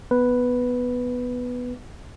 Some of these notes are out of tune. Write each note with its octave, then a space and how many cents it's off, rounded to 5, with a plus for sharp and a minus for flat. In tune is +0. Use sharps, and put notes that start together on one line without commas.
B3 +0 B4 +0